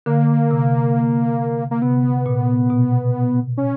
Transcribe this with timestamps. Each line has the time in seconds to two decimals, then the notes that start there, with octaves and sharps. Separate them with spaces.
0.06 D3 A#3
0.51 C3
1.71 A#3
1.82 C3 B3
2.26 A#2
2.70 B2
3.57 C#4